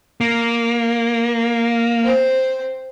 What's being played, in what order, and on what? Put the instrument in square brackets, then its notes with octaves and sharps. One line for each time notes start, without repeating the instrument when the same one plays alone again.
[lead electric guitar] A#3
[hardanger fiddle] C4 C5